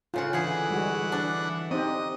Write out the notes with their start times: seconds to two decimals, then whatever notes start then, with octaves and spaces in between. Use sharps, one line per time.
0.14 A2 C#3 F4 F#5
0.33 D3 E3 G#4 F#5
0.70 G3 G#3 F#4
1.12 D4
1.71 C4 D#4 G4 D#5